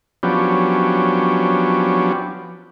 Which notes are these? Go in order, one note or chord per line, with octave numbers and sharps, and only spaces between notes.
F3 F#3 B3 C#4 D4 G4